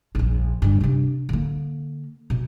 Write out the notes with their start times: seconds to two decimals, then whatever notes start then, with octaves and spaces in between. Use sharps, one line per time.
0.15 A#1 E2
0.62 G2 D3
0.80 C3 D4
1.29 D3 A#3
2.30 B2